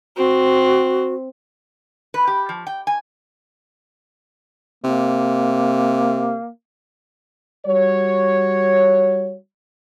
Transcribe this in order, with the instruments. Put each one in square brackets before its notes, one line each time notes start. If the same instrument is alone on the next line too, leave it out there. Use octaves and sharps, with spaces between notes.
[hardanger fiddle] C4 [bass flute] F#4
[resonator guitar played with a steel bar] B4
G4
F3
G5
G#5
[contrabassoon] C3 [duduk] A#3
[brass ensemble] G3 F#4 C#5